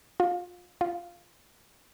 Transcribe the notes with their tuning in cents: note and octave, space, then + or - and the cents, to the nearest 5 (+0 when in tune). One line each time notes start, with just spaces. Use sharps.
F4 +25
F4 -5